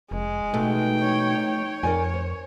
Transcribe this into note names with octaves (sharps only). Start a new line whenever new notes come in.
F1 G#3
B2 A3 D#4 G5
C#5
C#5
F2 A#4 D5 G#5
C5